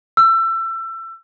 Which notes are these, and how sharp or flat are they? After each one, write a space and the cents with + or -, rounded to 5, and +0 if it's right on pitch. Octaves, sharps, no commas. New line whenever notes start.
E6 +25